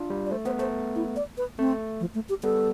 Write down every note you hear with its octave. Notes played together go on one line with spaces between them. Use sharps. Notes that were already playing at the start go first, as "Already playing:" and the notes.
Already playing: D4 F4
G3
D5
A3 C5
B3 C5
A3 C5
E4
D5
B4
A3 C4
F3
A3
G4
G3 B3 A4